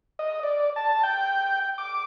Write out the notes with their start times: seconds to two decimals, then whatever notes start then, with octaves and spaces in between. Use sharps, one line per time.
0.19 D#5
0.43 D5
0.76 A5
1.03 G5
1.78 D6